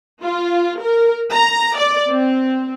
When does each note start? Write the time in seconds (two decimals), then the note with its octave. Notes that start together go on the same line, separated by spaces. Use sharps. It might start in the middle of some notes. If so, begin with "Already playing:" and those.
0.24 F4
0.81 A#4
1.32 A#5
1.77 D5
2.09 C4